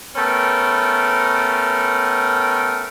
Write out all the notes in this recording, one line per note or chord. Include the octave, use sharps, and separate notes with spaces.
A3 B3 C#4 A#4 G5